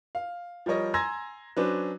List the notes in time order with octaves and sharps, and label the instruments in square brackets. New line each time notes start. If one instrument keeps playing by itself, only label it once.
[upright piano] F5
F3 G3 A#4 C#5 D#5
G#5 A#5 C6 E6 G#6 A#6
F#3 C#4 D4 B4 C5